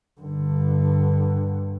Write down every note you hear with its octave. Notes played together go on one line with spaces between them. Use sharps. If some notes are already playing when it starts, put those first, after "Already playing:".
G2 D3